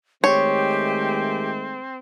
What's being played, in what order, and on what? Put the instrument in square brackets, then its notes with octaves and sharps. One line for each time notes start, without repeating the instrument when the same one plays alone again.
[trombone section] D#3 G#3 A3 [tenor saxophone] C4 [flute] G4 [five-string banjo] C#5